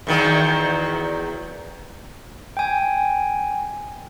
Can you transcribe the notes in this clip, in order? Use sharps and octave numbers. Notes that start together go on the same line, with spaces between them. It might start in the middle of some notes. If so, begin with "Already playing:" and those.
E2 D#3 F#3
G5 G#5